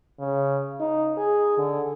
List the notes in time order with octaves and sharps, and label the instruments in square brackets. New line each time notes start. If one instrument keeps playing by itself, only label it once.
[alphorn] C#3
D#4
G#4
D3